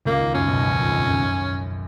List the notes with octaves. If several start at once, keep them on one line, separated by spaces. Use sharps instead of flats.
C#2 C#3 A#3
D#2 D#3
F#2 F#3 C#4
B1 B2
G#1 G#2
F2
F#2
F#2
F#2